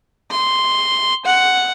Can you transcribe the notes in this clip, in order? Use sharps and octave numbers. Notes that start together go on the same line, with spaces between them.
C6
F#5